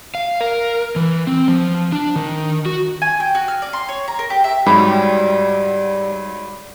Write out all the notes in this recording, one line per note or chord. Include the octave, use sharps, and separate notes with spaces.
F5
A#4
E3
C4
F3
D4
D#3
F#4
G#5
G5
F#4
F6
D5
C6
C#5
A#5
A#4
G4
E5
G#2 F#3 G3 B5